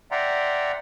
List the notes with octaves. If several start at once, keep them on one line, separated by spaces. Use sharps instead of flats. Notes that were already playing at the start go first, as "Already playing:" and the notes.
D5 E5 F#5 G5 A#5 C6